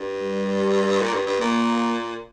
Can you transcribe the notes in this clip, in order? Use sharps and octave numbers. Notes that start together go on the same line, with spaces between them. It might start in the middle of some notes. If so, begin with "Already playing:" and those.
Already playing: G2
G3
A#2
G2
G2
A#2 A#3